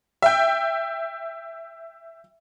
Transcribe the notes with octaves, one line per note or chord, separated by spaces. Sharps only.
E5 G5